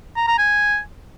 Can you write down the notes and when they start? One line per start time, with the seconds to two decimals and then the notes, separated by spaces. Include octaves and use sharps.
0.17 A#5
0.28 A#5
0.38 G#5